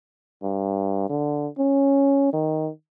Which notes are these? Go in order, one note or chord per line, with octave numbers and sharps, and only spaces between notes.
G2
D3
C#4
D#3